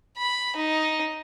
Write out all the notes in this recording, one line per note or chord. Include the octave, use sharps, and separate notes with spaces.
B5
D#4